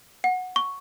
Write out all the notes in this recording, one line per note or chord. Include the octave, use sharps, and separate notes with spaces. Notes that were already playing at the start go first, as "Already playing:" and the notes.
F#5
C#6